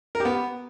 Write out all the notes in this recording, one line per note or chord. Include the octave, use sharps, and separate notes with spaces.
A#4
G4
B3